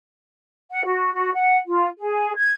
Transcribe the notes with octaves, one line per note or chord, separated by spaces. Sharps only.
F#5
F#4
F#4
F#5
F4
G#4
G#6